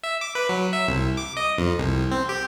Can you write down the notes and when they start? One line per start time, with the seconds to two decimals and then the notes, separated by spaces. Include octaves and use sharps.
0.03 E5
0.21 D6
0.35 B4
0.49 F#3
0.73 E5
0.88 C2
1.17 D6
1.37 D#5
1.58 F2
1.79 C2
2.12 C4
2.29 G4